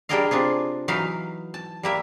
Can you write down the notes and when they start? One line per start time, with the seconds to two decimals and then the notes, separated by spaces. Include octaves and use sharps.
0.09 G3 D4 G#4 A#4 D#5 F5
0.31 C3 D4 F4 G#4
0.88 E3 F#3 D#4 B4 F5
1.54 A5
1.83 G3 A#3 E5